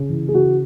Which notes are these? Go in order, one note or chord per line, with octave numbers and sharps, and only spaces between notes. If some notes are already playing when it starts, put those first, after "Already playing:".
Already playing: C#3
E3
G#4
C#3 F#4